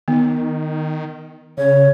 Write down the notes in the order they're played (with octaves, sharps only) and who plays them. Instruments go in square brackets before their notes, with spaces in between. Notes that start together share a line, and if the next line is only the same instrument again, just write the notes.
[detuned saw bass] D#3 [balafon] B3
[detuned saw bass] C#3 [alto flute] C#5